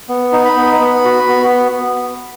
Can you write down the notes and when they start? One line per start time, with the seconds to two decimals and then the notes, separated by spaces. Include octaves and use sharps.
0.09 B3
0.32 D#4
0.45 B5
0.57 B3
0.80 B3
1.05 F#4
1.28 B3